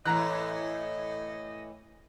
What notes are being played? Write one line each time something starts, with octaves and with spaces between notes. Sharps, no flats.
A2 E3 D#5 A#5 F#6